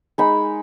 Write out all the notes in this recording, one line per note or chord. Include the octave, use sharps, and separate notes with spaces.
G#3 D#4 B5